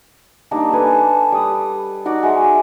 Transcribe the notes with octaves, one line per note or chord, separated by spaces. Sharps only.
G3 A#3 D4 D#4
A4 B4 G#5 D6
G3 D#6
D#4 F#4 D5
G#3 F#4 E5